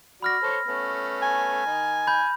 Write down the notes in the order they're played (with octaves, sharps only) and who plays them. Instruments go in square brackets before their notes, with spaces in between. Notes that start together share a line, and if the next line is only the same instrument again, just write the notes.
[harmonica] F#4 D5 [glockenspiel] B5 F6 A#6
[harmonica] A4 C5 C#5
A3 B3 C#4
[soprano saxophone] G#5
[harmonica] D#3 D#4
[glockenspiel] B5 G6